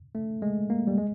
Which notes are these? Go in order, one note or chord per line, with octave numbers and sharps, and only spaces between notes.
A3
G#3
A#3
G3
G#3